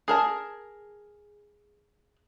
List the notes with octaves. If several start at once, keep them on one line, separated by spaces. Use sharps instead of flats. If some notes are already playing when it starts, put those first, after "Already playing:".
G#4 A#4 A5